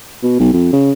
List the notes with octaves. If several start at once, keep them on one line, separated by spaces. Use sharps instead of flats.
B2
B1
F2
C#3